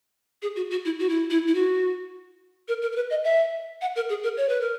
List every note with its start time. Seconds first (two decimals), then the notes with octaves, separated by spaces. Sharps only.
0.42 G#4
0.56 F#4
0.71 F#4
0.85 E4
0.99 F#4
1.09 E4
1.30 E4
1.47 E4
1.55 F#4
2.68 A#4
2.82 A#4
2.92 A#4
2.96 B4
3.10 D#5
3.24 E5
3.81 F#5
3.96 A#4
4.09 G#4
4.23 A#4
4.37 C#5
4.49 B4
4.61 A#4